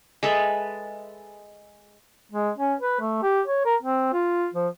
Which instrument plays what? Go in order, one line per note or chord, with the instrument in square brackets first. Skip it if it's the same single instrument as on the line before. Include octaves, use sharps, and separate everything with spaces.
[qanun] G#3 A4 B4 E5
[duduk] G#3
C#4
B4
A3
G4
C#5
A#4
C4
F4
F3